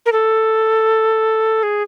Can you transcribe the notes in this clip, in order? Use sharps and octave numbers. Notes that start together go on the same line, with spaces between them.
A#4
A4
G#4